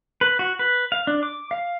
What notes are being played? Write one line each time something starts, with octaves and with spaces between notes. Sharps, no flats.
B4
F#4
B4
F5
D4
D6
F5